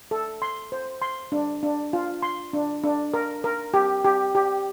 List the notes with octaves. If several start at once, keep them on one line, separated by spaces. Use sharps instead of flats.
A4
C6
C5
C6
D4
D4
F4
C6
D4
D4
A#4
A#4
G4
G4
G4